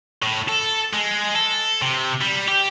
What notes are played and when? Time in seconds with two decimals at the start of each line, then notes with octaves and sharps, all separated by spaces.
0.23 A2
0.49 A4
0.93 G#3
1.35 A4
1.82 C3
2.21 G3
2.48 G4